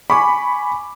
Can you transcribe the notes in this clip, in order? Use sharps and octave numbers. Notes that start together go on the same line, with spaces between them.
G#5 B5 C#6 D6